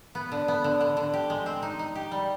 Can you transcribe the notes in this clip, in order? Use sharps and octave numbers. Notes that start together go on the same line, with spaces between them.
B3
D3
B3
D3
D3
D3
G4
G#3
C4
D#4
D#4
G4
G3